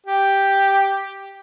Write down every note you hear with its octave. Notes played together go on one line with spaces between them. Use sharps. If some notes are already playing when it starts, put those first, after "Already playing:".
G4